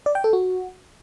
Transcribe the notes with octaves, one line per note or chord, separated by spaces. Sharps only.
D5
G5
A4
F#4